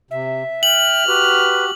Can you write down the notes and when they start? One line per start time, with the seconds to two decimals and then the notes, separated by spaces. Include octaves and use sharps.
0.11 C3 E5
0.63 G5 F6 F#7
1.07 F#4 G4 B4